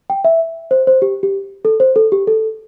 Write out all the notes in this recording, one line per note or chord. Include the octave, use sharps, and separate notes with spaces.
G5
E5
C5
C5
G4
G4
A4
C5
A4
G4
A4